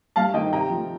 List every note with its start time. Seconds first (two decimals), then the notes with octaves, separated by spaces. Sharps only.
0.16 G2 F5 A5
0.34 D#3 A3 D#5 G5
0.52 C3 G5 A#5
0.70 F3 A3